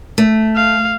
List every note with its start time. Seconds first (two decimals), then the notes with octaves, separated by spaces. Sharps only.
0.18 A3
0.56 F5